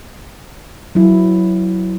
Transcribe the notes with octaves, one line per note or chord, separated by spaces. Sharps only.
F#3 E4